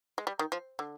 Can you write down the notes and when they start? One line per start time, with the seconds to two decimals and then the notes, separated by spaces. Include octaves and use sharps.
0.18 G#3
0.27 G3
0.39 D#3
0.52 F3
0.79 D3